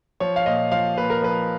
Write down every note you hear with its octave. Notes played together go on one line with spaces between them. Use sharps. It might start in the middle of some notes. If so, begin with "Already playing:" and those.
F3 C#5
F5
A#2 D#5
F3 F5
A#2 B4
A#4
F3 B4